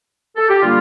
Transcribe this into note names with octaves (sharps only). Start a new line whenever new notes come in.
A4
G4
D3 G3 A#3 F4